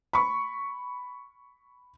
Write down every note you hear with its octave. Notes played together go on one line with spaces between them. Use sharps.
B5 C#6